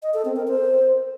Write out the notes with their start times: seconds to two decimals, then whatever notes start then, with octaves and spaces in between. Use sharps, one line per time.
0.03 D#5
0.14 A4
0.25 C4
0.36 A#4
0.48 C5